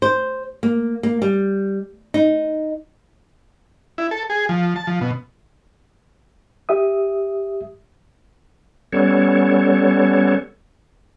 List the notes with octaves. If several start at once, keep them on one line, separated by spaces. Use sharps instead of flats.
C5
A#3
A#3
G3
D#4
E4
A4
G#4
F3
A5
F3
B2
G4 E5 D#6
G3 B3 C#4 A4 C#5